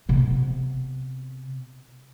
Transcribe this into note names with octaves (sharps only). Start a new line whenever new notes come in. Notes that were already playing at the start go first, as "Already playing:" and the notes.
C3 B3